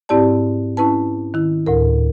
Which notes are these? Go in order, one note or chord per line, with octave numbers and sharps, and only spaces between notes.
G#2 C4 E4 G4 D5 A5
C#4 E4 B4 A5
D#3 E4
D2 A2 A#4